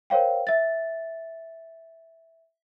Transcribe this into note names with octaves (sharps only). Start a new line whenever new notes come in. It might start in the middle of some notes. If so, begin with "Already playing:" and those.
A#4 C5 C#5 F5 G5
E5 A6